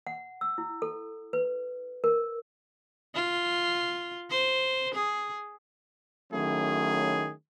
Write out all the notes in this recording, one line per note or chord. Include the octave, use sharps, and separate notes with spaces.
F#5
E6
E4
A4
B4
A#4
F4
C5
G#4
D#3 F#3 A3 C#4 E4 G#4